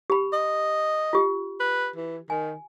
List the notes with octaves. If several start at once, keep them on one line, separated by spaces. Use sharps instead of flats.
G4 B5
D#5
F4 G4
B4
E3
D#3 G#5